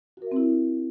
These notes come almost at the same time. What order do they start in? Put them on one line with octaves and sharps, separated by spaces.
F#4 A#4 E5 C4 E4